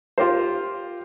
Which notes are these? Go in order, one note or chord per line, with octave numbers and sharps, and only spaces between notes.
F4 G4 A#4 C5